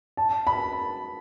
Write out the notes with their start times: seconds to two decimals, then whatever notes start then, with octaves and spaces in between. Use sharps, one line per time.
0.17 A5
0.47 B5